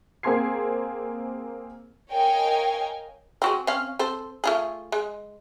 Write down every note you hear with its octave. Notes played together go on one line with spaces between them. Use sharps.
A#3 C4 G#4 C6 G#6 C7
A#4 C#5 D#5 F5 G5 G#5
C4 F#4 G#4
C4 C#4 F5
C4 A4 C5
A3 F4 G#4
G#3